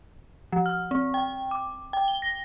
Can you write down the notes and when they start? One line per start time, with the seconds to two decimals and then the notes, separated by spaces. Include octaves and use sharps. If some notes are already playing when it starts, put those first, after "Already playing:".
0.52 F3
0.66 F6
0.91 C4
1.14 G5
1.51 D6
1.93 G5
2.08 G7
2.22 A#6